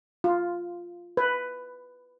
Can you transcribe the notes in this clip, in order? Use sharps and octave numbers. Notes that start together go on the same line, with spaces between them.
F4
B4